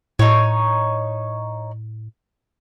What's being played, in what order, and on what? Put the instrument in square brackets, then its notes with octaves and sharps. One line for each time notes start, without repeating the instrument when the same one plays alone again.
[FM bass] A2 [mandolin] D#4 C#5